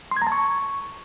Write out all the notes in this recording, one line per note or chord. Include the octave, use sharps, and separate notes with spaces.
C6
G#6
A#5
A5
C#6